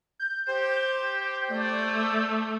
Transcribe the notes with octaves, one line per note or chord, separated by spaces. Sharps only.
G6
G4 C5
A3 D5